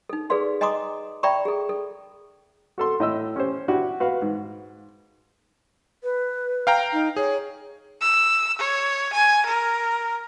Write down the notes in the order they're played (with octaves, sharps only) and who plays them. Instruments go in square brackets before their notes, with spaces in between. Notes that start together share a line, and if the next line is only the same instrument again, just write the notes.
[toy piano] D#4 A4
G#4 A4 B4 D5 F5 C6
D#5 G#5 A#5 C6 D6 D#6
D5 E5 G5 A#5 B5 C#6
G#4 A4
A4
[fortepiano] F#4 A4 C6
A2 D#5 E6
C#4 G4 C5
D4 E4 F#4 G4
F#4 B4 F5
G#2
[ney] B4
[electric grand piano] F5 G5 A#5
[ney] D#4
[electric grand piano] G#4 [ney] C#5
[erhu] E6
C#5
G#5
A#4